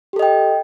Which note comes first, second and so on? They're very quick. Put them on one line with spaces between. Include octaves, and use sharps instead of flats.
G4 A4 D#5 G5